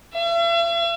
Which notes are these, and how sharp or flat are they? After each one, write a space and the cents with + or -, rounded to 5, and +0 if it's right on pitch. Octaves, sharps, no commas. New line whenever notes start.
E5 +45